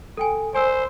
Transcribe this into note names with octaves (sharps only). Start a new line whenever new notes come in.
A4 G5 G#5
C5 G#5 E6